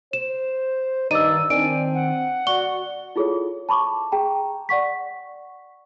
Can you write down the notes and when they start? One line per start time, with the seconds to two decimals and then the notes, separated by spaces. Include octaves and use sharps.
0.13 C5 E7
1.11 G2 D#3 D#4 D5 E6 D#7
1.50 D#3 C4 D4 G#5 D7
1.94 F#5
2.47 F#4 D5 G7
3.16 E4 F4 G#4 A4 C#5
3.69 A5 B5 C#6 D6
4.12 G#4 G5 A#5
4.69 D5 F#5 C#6 B6